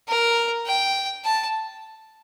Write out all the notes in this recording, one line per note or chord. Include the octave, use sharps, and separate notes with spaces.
A#4
G5
A5